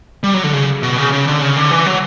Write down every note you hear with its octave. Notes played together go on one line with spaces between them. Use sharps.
G3
F#3
D3
C#3
B2
C#3
C#3
D3
C#3
D3
E3
F#3